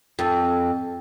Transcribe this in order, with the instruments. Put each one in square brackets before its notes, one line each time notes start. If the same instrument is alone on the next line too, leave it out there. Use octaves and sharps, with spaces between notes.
[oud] F2